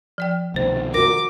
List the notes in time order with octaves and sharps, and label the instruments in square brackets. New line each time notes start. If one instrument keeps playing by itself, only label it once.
[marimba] F3 D5 G5
[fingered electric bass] C2 B2 D#3 [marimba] A3 C5
[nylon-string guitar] F#4 A#4 [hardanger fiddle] D6 [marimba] A#6